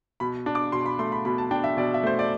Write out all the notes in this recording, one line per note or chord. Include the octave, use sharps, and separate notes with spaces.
B2 B5
D4
D6
B2 C6
B5
A3 C6
B5
B2 B5
A5
D4 G5
E5
B2 D5
E5
A3 C5
D5